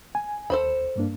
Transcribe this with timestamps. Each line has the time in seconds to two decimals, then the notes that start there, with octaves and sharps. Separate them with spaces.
0.15 G#5
0.50 D#2 A4 C5 B5
0.96 G2 A#3 D4